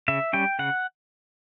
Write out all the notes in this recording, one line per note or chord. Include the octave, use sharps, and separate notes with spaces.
C#3 E5
G3 C#4 G5
C#3 F#5